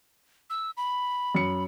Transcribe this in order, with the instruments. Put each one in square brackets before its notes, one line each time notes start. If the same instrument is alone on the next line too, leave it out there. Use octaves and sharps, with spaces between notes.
[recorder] E6
B5
[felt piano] F#2 C#7